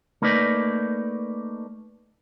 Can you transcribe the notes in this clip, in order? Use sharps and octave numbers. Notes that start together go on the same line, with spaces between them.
A3 A#3 D#4 B4 D5